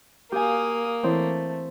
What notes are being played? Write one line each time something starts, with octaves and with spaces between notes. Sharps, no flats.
A#3 G4 F5 G#5 D#6
E3 A3 C4 E4 C#5